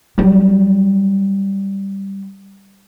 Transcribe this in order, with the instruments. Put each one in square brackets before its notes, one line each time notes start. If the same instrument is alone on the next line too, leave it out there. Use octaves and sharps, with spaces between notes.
[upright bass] F#3 G3